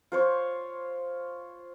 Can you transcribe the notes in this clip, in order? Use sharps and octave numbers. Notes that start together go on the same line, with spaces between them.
F4 C5 C#5